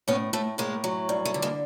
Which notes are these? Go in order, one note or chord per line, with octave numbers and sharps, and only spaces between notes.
A2 B3 C#4
A2 A3
A2 G#3 A#3
F#3
G2
A3
D3
G#3 A#3